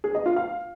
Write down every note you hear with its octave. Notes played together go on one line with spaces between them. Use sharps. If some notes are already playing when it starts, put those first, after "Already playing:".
G#4
D#5
F4
F5